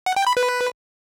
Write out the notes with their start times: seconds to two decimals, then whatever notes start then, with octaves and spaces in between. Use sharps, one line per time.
0.06 F#5
0.16 G5
0.27 B5
0.37 B4